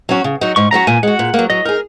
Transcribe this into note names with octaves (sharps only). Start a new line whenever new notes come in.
F#3 C#4 F#4
C#3
F#3 D#4 F#4
G#2 C#6
F#3 C#4 F#4 A#5
A#2 G#5
G#3 F#4 F#5
A#2
A#3
F#3
F#3 D#5
D#4 G#4 A#4